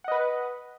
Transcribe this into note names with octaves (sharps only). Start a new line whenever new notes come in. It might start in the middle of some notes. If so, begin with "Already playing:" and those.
B4 D#5 F#5